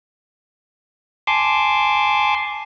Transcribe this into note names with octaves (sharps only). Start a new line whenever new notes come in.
G#5 A5 C6 D6